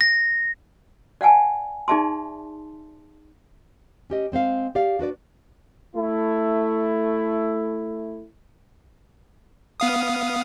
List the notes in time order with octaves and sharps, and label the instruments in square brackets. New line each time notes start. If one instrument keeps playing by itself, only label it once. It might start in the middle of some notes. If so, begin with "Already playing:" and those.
[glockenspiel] A#6
[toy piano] D5 F5 F#5 G#5 A5
D#4 G#4 D5 E5 A5 C6
[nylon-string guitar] C#4 G4 D#5
G#3 C4 C5 F5
G4 D5 F5
D4 F#4 B4 D5
[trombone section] A3 E4
[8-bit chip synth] B3 F5 D#6